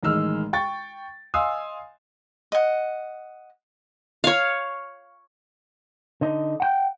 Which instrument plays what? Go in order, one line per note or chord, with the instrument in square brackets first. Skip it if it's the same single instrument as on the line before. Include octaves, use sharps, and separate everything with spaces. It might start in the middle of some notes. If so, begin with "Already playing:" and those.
[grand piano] A1 D#3 G#3 E6 F6
G5 C#6 A6
D#5 F5 G#5 C6 D#6 E6
[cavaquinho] D#5 F#5
[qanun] C#5 F5
[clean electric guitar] D3 D#4 D#5
F#5 G5